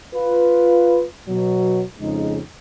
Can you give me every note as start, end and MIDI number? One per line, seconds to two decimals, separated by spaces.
0.15 1.04 65
0.15 1.04 71
1.29 1.83 47
1.29 1.83 54
2.00 2.40 41
2.00 2.40 49
2.00 2.40 56
2.00 2.40 63